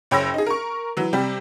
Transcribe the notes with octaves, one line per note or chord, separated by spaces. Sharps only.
F#1 C#5 G5 B5 E6 A#6
D#4 G#4
A#4 C#6
E3 F#3
C3 G3 G4